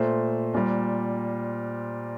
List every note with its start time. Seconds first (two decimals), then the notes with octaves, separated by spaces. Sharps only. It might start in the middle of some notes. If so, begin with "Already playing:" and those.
Already playing: A#2 A3 C5
0.54 A#2 G3